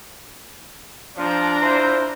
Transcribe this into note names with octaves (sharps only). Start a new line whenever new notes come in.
F3 D4 A#5
E4 F4 C5